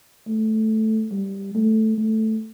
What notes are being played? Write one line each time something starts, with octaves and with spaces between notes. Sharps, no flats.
A3
G3
A3
A3